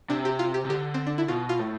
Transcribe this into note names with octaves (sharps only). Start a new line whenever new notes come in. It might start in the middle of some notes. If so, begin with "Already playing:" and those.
C3 D4
G4
F4
G4
C3
D3 G4
C4
D4
E4
B2 F4
F4
A2